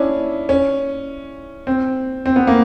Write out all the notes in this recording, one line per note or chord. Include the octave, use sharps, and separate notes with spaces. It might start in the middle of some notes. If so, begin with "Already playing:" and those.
Already playing: C#4 D4 E4
C#4
C4
C4
B3
A#3